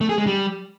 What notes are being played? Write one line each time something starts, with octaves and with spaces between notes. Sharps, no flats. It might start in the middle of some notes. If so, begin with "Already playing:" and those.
A3
G#4
G#3
G3